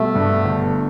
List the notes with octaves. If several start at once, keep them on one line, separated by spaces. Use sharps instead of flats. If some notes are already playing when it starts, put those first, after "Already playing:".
Already playing: B2 G3 A3
G2
G1